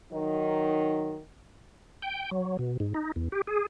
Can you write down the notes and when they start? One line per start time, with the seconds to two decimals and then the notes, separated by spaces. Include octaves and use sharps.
0.13 D#3 F#3 D#4
2.02 G5
2.31 F#3
2.59 B2
2.80 G#2
2.94 D#4
3.16 E2
3.32 G4
3.47 G#4